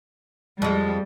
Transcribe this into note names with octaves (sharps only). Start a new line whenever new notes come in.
F2 G3 G#3